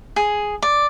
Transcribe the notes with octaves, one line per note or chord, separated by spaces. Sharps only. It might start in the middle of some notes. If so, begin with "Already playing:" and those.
G#4
D5